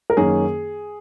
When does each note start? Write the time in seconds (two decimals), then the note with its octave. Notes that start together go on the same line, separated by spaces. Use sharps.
0.10 A#4
0.17 F#2 D#3 A#3 C#4 G#4